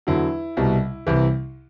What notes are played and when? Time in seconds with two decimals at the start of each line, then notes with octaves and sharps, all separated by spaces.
0.07 E2 D3 F#3 E4
0.57 C2 B2 G3
1.07 C2 C3 E3